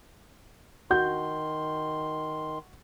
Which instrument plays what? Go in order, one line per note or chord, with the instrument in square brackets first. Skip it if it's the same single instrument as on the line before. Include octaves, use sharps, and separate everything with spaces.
[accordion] D#3 C6 [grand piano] F#4 G6